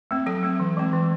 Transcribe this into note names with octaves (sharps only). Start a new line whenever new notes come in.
A3 C4
F#3 A4
A3 C4
E3
G#3 C4
E3